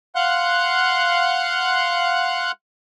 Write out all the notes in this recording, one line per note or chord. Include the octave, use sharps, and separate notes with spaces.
F5 F#5 C6 F#6